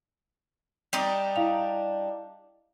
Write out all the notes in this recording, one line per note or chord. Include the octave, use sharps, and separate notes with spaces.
G3 D4 D#4
E4 F5 F7